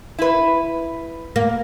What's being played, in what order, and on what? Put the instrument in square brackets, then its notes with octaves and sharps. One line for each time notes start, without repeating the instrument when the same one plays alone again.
[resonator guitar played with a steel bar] E4 B4
[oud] A#3